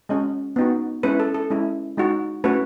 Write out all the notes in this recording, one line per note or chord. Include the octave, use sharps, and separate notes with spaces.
G#3 C#4 F#4 D#5
B3 D#4 F#4
G#3 C#4 E4 B4
A4
A4
G#3 C#4 E4
G#3 D#4 F#4
A3 C#4 F#4 B4